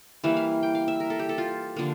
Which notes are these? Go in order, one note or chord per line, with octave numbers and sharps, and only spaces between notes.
E3 G3 A#3 E5
F5
G5
F5
E5
A#4
A4
G4
A4
F4
D3 F3 A#3